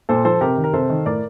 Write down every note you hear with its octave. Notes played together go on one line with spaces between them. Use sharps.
A#2 A4 C5
F3 A4 C5
C3 G4 A#4
D#3
A#4
C3 A4 C5
D#3
A2 A#4 D5